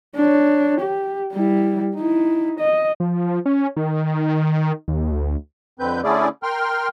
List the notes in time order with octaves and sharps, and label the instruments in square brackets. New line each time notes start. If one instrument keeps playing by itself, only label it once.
[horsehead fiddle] D4 C#5
G4
G3 E4
D#4 E4
D#5
[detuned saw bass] F3
C#4
D#3
D#2
D2
[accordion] F2 D3 C4 B4 G6
D3 A3 C#4 E4 G#4 D5
A#4 G5 C6 F6